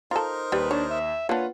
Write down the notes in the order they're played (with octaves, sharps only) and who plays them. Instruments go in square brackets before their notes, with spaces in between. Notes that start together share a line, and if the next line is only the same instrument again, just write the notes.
[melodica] D#4 A#4 C5 [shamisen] F4 A4 [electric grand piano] A#5
[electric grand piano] D#2 [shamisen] G3 [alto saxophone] B4
[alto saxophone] D4 [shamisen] C#5
[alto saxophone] E5
[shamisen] A#3 D4 [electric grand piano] F4 B4 F#5 [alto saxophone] C#5